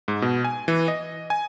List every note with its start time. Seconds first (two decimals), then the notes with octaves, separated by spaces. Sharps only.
0.08 G#2
0.22 B2
0.44 G#5
0.68 E3
0.88 D#5
1.30 G#5